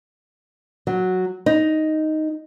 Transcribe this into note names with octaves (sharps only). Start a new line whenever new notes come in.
F#3
D#4